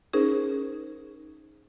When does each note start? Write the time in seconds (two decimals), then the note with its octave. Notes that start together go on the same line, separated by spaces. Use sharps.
0.13 C#4 D#4 G#4 A#4 C5